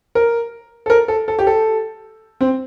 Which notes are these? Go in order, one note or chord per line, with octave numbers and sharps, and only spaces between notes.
A#4
A4
A#4
A4
A4
G4
A4
C4